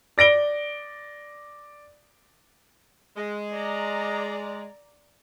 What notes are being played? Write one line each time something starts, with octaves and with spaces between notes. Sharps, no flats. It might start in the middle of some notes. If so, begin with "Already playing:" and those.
D5 A#6 D7 G7
G#3
D5 A#5